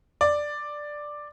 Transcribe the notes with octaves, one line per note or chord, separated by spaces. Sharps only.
D5